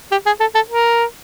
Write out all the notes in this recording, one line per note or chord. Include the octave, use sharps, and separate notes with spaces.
G4
G#4
A4
A4
A#4